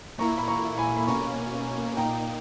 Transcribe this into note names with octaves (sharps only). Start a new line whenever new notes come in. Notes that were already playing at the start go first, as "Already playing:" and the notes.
A#2 A#3 E4 A#5 C#6
B5
A#5 C#6
G#5 B5
B5
B2 A#3 C#4 A#5 C#6
A#2 A#3 D#4 G5 A#5